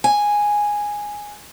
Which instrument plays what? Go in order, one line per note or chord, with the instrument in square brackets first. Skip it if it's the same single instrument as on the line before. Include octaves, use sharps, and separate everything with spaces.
[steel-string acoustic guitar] G#5